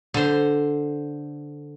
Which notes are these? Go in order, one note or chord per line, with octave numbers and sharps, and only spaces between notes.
D3 C5